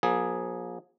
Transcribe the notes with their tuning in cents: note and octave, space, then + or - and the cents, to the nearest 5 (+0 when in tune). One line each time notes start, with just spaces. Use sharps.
F3 +35 A#3 +35 G#4 +0